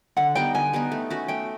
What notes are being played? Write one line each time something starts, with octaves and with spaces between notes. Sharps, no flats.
D3 F#5
G3 B3 D#4 G5
D3 G#5
G3 B3 D#4
A3
C#4 F#4
A3 G5